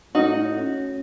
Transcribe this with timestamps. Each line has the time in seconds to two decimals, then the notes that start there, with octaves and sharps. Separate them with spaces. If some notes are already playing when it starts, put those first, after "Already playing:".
0.15 A2 D#4 F#4
0.56 C#4